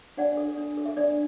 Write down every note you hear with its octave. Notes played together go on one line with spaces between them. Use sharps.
D4 D5 F#5
A4
D4
A4
E5
D4 D5